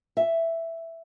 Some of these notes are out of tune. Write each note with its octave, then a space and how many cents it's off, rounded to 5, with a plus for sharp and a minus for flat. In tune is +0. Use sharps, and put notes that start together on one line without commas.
E5 +5